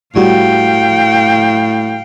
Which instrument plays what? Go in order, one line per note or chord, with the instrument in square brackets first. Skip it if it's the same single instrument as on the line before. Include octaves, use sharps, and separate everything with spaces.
[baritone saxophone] A2 [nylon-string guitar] G3 F#4 [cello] F5 G5